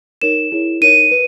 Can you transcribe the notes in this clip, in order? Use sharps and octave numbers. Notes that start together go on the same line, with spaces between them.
D#4 A#4 C#5 E7
E4 G#4 C#5
D#4 A#4 C#5 D#7
B4